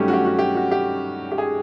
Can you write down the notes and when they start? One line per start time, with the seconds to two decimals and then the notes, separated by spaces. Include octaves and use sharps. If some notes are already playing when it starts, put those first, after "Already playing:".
Already playing: G2 D#3 F#3 A3 C#4 G4
0.08 F#4
0.13 G4
0.25 F#4
0.39 G4
0.55 F#4
0.71 G4
1.32 G4
1.38 G#4